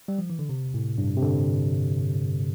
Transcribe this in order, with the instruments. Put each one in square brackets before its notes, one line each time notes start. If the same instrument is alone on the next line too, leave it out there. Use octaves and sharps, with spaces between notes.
[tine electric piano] G3
F3
E3
D3
C3
A2
G2
C3
D3